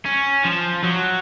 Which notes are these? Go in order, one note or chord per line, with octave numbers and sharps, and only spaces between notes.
C#4
F3
F#3